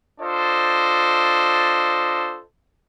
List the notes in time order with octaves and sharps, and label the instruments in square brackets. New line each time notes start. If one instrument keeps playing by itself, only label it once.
[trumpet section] D4 F4 A4 C5 D#5